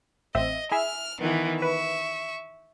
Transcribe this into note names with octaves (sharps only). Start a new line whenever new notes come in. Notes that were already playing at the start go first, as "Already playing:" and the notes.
A1 C4 D#5 E5
E4 G#4 E5 F6
D#3 E3 B3
B4 E5 C#6